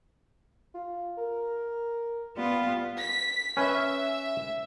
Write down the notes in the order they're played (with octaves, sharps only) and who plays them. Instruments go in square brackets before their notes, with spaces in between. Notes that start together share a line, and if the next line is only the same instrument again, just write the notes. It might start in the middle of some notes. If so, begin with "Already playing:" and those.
[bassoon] F4
A#4
[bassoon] G3 [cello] B3 F4
[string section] B6
[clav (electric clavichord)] C#4 B4 [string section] E5